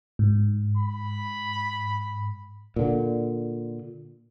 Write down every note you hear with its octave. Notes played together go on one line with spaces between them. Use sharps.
G#2
B5
A#2 D3